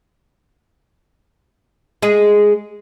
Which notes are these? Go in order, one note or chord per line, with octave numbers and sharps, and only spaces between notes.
G#3 G#4